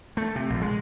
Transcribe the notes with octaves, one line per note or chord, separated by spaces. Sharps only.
A3
C3
A#1
G#3